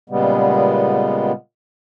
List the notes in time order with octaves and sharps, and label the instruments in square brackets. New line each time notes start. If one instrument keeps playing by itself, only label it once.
[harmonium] A#2 C#3 G3 G#3 B3